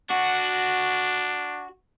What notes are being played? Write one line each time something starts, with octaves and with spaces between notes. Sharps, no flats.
D4 F#4